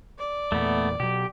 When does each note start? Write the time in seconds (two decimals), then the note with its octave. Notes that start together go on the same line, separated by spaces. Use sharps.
0.18 D5
0.52 E2 A#2 A3 B3
1.00 B2 F#3 G4